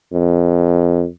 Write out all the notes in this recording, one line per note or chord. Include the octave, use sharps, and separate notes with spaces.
F2